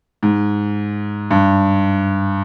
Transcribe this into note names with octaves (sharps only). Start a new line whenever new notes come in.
G#2
G2